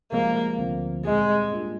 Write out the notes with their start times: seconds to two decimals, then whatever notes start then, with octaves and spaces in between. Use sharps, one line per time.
0.12 C2 C3 F3 G#3 A#3
0.58 D2 D3 F3 C4
1.04 C2 A#2 G3 G#3 C4 D#4
1.51 G#2 G3 A#3 D4 F4